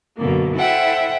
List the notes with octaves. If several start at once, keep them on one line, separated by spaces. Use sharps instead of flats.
F#2 B2 D3 A#3
E4 A4 C5 E5 F#5 G5